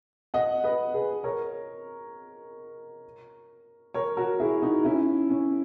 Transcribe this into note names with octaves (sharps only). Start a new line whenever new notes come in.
D#5 F#5
B4 D#5
G#4 B4
A#4 C#5
A#4 C#5
F#4 A#4
E4 G#4
D#4 F#4
C#4 E4
C#4